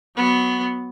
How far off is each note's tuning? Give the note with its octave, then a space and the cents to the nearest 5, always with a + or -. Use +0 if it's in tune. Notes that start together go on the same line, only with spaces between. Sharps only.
F#3 +0 B3 +0